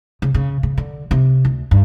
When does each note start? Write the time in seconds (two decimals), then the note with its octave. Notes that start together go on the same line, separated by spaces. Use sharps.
0.22 C#3
0.34 C#3
0.63 C#3
0.78 D3
1.11 C3
1.45 D2
1.71 G2